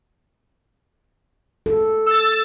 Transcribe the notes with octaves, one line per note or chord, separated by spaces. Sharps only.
A4
E6 A6